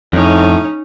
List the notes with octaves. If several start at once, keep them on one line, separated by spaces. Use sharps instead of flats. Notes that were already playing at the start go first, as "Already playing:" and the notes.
F2 A2 C#4 D#4